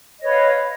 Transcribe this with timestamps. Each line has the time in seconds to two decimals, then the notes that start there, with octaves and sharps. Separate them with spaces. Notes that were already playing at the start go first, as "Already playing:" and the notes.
0.19 D#5
0.22 C#5
0.25 B4
0.27 F5